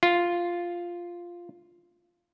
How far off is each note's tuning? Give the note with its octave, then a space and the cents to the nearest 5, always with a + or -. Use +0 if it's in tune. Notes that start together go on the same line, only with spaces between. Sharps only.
F4 +0